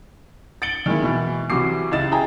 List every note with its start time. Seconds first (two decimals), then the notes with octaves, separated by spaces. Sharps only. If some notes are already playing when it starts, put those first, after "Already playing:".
0.62 A6 C#7 D7 F#7 G7
0.86 D#3 G#3 A#3 E4
1.02 B2 E3
1.50 C2 E3 F#3 F#4 D6 C7
1.91 C#2 E4 D#5 A6 E7
2.11 E4 G#4 G5 A#5